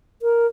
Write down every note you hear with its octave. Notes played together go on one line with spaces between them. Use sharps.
A#4